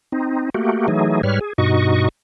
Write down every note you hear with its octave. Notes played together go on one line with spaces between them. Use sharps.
C4 D#4
A3 A#3 F#4 G4
E3 F#3 A3 D#4 G#4
G#2 G3 B4 C#5 F6
G#4
G2 B2 D#4 F#4 D#5 C#6